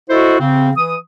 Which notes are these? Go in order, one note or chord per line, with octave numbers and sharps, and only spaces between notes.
E4 F#4 A4 C5 D#5
C#3 C4
E3 D#6